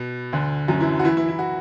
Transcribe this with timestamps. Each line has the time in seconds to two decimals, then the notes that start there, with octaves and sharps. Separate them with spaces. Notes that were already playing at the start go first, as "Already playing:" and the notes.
Already playing: B2
0.33 D2 D3
0.68 F#2 F#3
0.80 E3 E4
0.99 F#4
1.04 E3 E4
1.17 E3 E4
1.29 E4
1.39 F#4